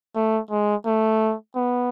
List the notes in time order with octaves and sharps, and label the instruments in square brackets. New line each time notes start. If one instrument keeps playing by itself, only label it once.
[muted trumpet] A3
G#3
A3
B3